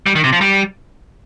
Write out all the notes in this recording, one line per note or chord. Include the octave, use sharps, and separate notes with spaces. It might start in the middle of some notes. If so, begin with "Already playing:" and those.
G3
D#3
C3
F3
G3